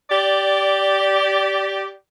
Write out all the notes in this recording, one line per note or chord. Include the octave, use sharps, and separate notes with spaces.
G4 D5